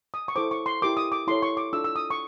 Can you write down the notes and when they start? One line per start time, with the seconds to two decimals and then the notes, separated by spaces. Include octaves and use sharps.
0.14 D#6
0.28 C#6
0.36 E4 A4 C5 D6
0.51 C#6
0.66 C6
0.82 E4 G4 A#4 D6
0.97 D#6
1.12 D6
1.27 E4 A4 C#5 C6
1.42 C#6
1.57 D6
1.73 D4 F4 A4 E6
1.84 E6
1.96 D#6
2.10 C#6